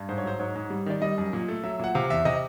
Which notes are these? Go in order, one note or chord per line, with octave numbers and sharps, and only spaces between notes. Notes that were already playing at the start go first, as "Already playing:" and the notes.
Already playing: G2
G#2 C5
C#5
F#3 C5
G#2 C#5
G#2
G3
D#3 D5
G3 D#5
F#2
A#2
A3
F#3 E5
A#2 F#5
C3 F5
E2 E5
C3 D#5